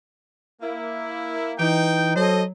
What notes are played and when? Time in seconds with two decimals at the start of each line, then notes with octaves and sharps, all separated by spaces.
0.61 A#3 E4
1.59 E3 D#4 G5
2.16 F#3 A4 C5 D#5